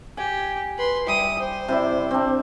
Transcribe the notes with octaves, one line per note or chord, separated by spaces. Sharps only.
G4 G#5
B4 C6
G3 E4 D#6
C5
C3 E4 D5
C4 D4